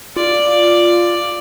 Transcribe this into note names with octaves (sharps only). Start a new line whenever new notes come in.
F4 D5